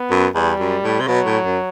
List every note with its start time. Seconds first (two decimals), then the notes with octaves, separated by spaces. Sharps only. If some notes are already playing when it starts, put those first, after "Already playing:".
Already playing: B3
0.11 F#2
0.35 E2 G3
0.60 F#2
0.83 A2
1.00 C3
1.07 B2 F#3
1.26 A2
1.45 F#2